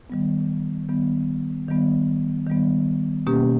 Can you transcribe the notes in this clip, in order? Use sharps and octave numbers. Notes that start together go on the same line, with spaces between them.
D#3 G3 B3
D#3 G3 B3
D#3 G3 B3
D#3 G3 B3
B2 A#3 C#4 G4